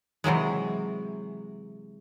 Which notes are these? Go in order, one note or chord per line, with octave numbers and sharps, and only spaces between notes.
C3 E3 F#3 G#3